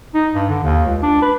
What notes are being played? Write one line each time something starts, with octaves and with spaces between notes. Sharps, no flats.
D#4
G2
D3
D#2
C#2
D4
B4